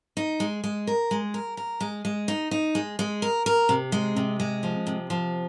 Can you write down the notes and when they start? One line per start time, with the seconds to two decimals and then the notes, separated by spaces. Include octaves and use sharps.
0.17 D#4
0.40 G#3
0.64 G#3
0.87 A#4
1.11 G#3
1.34 A#4
1.57 A#4
1.81 G#3
2.05 G#3
2.28 D#4
2.51 D#4
2.75 G#3
2.99 G#3
3.22 A#4
3.46 A#4
3.69 C3
3.92 G#3
4.16 C3
4.40 G#3
4.63 F3
4.87 C3
5.10 F3